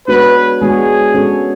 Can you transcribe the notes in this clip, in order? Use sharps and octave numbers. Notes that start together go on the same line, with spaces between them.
G#3 B3 D4 F#4 B4 C#5
G#3 B3 D4 F#4 G#4 C#5
G#3 C#4 F#4 A4 C#5